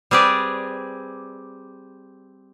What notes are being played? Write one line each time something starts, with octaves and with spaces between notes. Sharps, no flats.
G3 C4 G#4 B4 D5